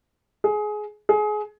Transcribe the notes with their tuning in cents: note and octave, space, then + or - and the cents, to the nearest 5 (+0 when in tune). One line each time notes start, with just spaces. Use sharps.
G#4 +20
G#4 +25